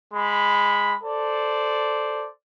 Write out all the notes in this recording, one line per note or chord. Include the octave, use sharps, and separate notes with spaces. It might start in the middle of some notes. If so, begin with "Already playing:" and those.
G#3 B5
A4 C5 D5